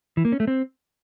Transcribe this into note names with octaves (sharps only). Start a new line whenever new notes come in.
E3
A#3
C#4
A3
C4